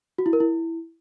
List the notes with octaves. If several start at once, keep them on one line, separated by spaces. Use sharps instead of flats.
F#4
E4
A#4
E4